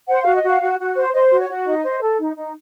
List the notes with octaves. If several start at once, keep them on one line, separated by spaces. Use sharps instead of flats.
C5 F#5
F#4 F5
D#5
F#4 F5
F#4
F#4
C5
C5 D#5
F#4
C#5
F#4
D#4 D#5
C5
A4
D#4
D#4